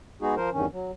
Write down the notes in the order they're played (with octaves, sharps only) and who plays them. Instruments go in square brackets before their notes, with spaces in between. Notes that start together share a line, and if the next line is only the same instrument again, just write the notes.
[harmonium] G#3 B3 D#4 F#4 G#4
F3 A#4 C5
E2 G2 D#3 C#4
F#3